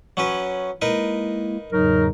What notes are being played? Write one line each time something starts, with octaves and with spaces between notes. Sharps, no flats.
F#3 C#4 B4
G#3 A#3 D#4 E4 A#4 B4
E2 G#2 C#3 F#3 D#4 A#4